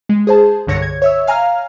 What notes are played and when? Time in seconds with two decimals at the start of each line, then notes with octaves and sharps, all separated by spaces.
0.09 G#3
0.27 G#4 C5 A5
0.67 C2 G2 D3 C#5 A#6 C#7
0.82 G#6
1.02 C#5 E5 E6
1.27 F5 G#5 A#5 F6